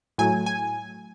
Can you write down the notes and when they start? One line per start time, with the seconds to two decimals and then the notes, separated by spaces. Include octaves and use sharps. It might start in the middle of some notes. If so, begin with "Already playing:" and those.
0.18 A2 F#3 A3 G#5
0.46 G#5